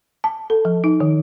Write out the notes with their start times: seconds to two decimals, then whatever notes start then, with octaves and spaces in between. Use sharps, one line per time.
0.24 A5
0.50 A4
0.65 F3
0.84 D#4
1.00 D#3